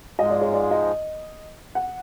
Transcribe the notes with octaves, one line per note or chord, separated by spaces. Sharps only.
G#2 F3 G#3 D#5
D5
C#5
D5
D#5
F#5